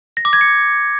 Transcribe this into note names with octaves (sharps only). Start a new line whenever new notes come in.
A#6
D6
G#6
C#7